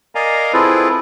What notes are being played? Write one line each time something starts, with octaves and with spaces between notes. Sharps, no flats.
A#4 D5 D#5 F5 G#5 A#5
C4 E4 F4 G#4 A4 B4